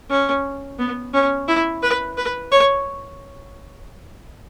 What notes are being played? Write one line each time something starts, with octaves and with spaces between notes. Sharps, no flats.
C#4
B3
C#4
E4
B4
B4
C#5